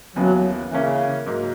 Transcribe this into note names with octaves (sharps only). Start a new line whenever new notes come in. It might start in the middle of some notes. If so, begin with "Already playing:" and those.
D#2 C#3 E3 F#3 B3
C#3 E3 A#3 C#4 E4
G#2 F#3 A#3